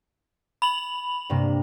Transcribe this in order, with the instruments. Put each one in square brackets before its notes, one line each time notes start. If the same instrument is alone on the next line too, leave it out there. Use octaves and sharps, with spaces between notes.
[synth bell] B5 F7 F#7
[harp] G2 C3 A#3